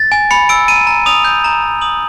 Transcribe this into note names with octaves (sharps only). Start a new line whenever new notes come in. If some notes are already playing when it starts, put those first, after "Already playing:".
Already playing: A6
G#5
B5 C#7
E6 D7
A#5 D#7
A#5
D#6 F7
G6
A#5
A#5
D#6 F#7